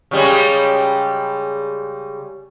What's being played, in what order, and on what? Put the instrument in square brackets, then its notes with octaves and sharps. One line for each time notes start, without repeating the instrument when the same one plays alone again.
[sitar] C#3 G3 G#3